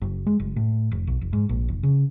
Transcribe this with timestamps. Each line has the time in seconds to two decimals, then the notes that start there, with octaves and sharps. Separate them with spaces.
0.02 F#1
0.26 G#3
0.40 F#1
0.56 A2
0.91 F1
1.07 B1
1.21 F1
1.33 G#2
1.49 A#1
1.68 F1
1.83 C#3